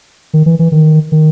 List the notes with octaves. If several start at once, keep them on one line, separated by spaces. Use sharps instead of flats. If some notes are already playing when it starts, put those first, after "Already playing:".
D#3
E3
E3
D#3
D#3